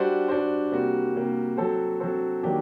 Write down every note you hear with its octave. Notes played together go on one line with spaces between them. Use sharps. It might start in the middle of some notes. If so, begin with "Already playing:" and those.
Already playing: G3 D4 F#4 C5
G3 D4 F#4 C5
C3 G3 A#3 F#4
C3 G3 A#3 F#4
F#3 C4 F#4 A4 C5
F#3 C4 F#4 A4 C5
D#3 F#3 A#3 D4 G4